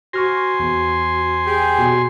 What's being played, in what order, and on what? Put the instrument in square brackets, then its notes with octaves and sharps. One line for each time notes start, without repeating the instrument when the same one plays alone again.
[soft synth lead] F#4 [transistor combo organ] C5 G#5 C6 [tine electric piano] C#6 F6 A#6
[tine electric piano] E2
[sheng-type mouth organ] G4 G#4
[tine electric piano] B2 [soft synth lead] F#4